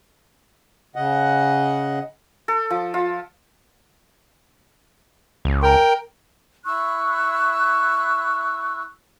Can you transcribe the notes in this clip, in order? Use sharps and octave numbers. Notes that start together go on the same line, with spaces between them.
C#3 D#5 F#5
A4
F3
F4
C#2
A#4 G5
E4 C#6 E6 F#6